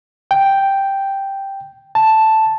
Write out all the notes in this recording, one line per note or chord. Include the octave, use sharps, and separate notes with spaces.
G5
A5